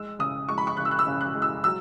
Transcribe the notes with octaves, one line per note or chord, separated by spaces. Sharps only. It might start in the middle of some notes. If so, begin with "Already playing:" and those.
Already playing: G#3 E6
C#3 D#6
G#3 C#6
B5
C#6
C#3 F#6
E6
F#6
E6
C#3
F#6
G#3
E6
F#3 E6